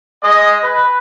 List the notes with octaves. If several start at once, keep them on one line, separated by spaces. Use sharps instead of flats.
G#3 D#5
B4